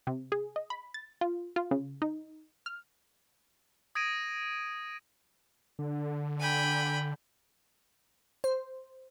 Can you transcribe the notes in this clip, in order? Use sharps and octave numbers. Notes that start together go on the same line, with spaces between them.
C3
G#4
D#5
B5
A6
F4
F4
C#3
D#4
F6
D#6 G#6 A#6 D7 D#7
D3
G5 G#5 B5
C5